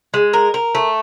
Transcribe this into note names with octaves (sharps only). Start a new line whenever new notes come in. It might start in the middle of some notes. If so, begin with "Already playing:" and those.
G#3
A#4
A#4
A3